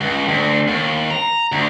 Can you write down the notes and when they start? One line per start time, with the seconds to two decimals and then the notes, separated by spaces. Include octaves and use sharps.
0.01 C#2
0.28 D2
0.68 D#2
1.11 A#5
1.52 D2